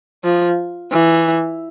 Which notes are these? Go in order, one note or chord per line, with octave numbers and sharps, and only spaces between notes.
F3
E3